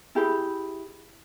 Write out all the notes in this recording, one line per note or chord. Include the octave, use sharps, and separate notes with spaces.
E4 G4 G#4 B5